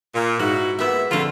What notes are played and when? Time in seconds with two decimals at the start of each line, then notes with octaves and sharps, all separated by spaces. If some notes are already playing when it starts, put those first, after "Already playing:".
0.15 A#2
0.39 G#2 D#4 E4 F#4
0.79 A#2 B3 E4 G4 E5
1.11 F2 D3 G3 A3 F4